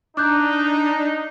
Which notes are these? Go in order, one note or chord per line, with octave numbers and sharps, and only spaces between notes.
D4 D#4 D6 F#6 G6